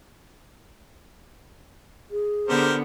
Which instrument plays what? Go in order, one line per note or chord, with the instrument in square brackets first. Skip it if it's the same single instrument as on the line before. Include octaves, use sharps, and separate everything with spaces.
[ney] G#4
[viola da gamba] D3 B3 [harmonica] G4 A#4 C5